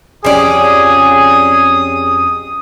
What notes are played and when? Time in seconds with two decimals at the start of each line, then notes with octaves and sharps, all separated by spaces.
0.25 F2 F3 C#4 G4 G#4 D5 D#6